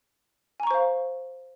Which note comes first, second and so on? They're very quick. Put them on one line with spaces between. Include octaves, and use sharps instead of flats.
G#5 A#5 C#6 C5 F5